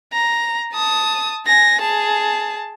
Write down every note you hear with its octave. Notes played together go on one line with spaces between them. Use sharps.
A#5
A5 D#6
G#5 A#6
G#4 A5